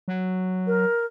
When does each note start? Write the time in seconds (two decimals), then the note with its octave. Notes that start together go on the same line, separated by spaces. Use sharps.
0.08 F#3
0.67 A#4